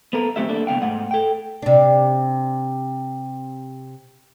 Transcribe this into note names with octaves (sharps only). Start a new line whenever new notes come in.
B3 A4 A#4
F#2 A3 C4 G4 E5
A#3 D4 A4
C2 B3 F5 G5
G#2 A3 F#5
A4 G5
C3 D4